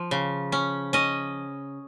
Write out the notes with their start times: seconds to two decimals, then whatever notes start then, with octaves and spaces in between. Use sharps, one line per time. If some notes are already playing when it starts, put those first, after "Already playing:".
Already playing: F3
0.11 C#3
0.52 C#4
0.93 C#4 D#5